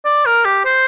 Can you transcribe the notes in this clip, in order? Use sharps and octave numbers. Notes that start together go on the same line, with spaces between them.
D5
A#4
G4
C5